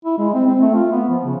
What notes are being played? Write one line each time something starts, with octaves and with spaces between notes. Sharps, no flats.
E4
G#3
C4
C4
A3
F4
B3
F3
C#3